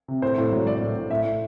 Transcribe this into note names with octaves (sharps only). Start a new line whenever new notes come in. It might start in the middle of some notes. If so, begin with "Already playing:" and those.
C3
A2 C5
A2
F#3
F#3 D5
A2
A2
A2 E5
A2